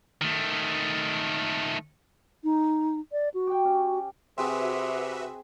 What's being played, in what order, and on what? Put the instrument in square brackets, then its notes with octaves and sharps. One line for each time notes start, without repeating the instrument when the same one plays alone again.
[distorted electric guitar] D#3 A3
[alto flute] D#4
D5
F#4
[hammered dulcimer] G4 G5
C#4
[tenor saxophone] C3 [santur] C4 G#4 [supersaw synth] F#4 B4 E5